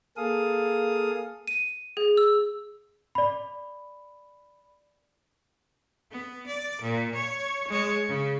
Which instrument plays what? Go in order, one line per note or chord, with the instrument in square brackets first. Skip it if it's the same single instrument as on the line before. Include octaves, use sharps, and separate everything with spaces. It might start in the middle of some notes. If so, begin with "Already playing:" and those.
[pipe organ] A#3 G#4 A4 F5 D#6
[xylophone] D#7
G#4
E6
[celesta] D5 B5
[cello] B3
D5
A#2
C#5
G#3 C#5
C#3